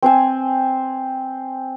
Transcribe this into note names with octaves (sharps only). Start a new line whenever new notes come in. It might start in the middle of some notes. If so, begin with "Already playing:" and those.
C4 C5 G#5